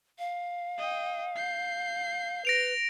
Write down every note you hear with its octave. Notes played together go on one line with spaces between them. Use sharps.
F5
D#5 G5
G6 C7
B4 A#6 D7 F7